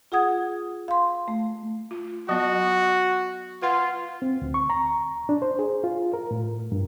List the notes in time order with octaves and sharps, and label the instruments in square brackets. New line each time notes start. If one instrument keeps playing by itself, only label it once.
[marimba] F4 G#4 F#5 D#6 G#6
F5 C6
A3
[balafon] F4
[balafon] F#3 B3 D#5 [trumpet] F#4
[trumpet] F4 [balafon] B4 F#5 C6
[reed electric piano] C4
D2
C#6
A#5
D4
C5
G#4
F4
A#4
A2
G2